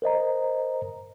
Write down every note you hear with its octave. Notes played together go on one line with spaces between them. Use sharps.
A#4 C5 D#5 A#5